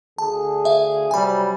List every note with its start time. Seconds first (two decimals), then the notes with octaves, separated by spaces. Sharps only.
0.18 D2 D3 G#4 A5
0.65 E5 F5
1.11 C3 F#3 G3 G#5 B5